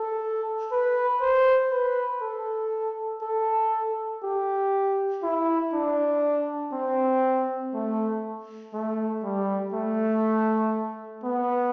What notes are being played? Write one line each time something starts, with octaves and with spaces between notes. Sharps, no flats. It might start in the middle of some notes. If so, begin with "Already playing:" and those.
Already playing: A4
B4
C5
B4
A4
A4
G4
E4
D4
C4
A3
A3
G3
A3
B3